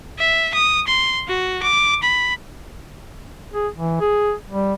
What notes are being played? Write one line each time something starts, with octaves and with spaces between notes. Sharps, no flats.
E5
D#6
C6
F#4
D6
B5
G#4
E3
G#4
G3